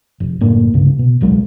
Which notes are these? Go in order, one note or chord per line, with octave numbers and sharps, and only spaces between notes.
F1
F#1 A2 A#3 D4
C2 G2 C#3
B2
D1 B1 F#3 G#3